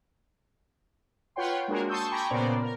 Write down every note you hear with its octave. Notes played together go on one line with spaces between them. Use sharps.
F4 B4 C#5 F#5 G5 C6
G#3 A#3 D4 F#4 G#4 A#4
A5 C6 C#6 D#6 E6 G6
G5 G#5 A#5 B5 C#6 D6
A#2 C#3 B3 A#4 C5 D5
A#4